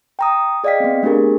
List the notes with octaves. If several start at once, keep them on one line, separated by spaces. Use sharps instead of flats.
G5 A#5 D#6
G#4 D5 D#5 F5 G5 B6
B3 C4
A3 D4 G4 G#4 A#4